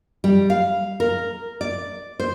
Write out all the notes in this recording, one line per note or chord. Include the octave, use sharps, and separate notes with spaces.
G3
F5
A#4
D5
C5